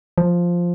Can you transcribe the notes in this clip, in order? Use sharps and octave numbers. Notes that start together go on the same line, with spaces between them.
F3